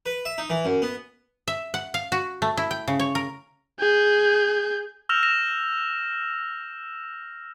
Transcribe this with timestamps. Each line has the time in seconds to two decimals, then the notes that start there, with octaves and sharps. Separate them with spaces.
0.06 B4
0.25 E5
0.38 D#4
0.50 E3
0.65 F#2
0.82 B3
1.48 E5
1.74 F#5
1.94 F5
2.12 F#4
2.42 A3
2.57 E4
2.71 G5
2.88 C#3
2.99 C#5
3.15 A#4
3.79 G#4 G6
5.09 E6 F6 G6 A#6 E7 F7
5.23 A#6 E7 F7